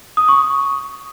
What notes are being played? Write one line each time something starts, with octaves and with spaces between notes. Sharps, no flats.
D#6
C#6